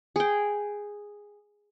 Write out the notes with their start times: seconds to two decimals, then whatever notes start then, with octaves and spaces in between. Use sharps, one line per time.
0.16 G#4 G5